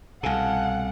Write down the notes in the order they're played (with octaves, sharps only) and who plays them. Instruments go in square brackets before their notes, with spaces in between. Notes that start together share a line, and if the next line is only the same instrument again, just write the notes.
[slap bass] C2 B2 [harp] A4 G#5 F6 [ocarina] F5 [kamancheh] F#5